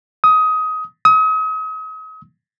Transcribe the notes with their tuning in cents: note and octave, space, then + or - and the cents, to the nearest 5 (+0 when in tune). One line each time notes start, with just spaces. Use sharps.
D#6 +20
D#6 +40